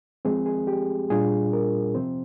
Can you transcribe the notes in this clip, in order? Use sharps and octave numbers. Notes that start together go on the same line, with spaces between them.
F3 G#3 C4 G#4
G#4
G4
A#2 G3 D4 F4 G#4
A#4
C3 F3 C4 C5